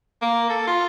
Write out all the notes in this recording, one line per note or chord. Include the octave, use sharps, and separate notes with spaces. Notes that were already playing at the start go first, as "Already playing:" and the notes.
A#3
A4
F4